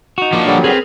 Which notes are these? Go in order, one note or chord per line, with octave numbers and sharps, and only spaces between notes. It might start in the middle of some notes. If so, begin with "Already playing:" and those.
D#4 F#4
F3 A#3 D4
D3 F#3 G3
C4 G#4 A#4 B4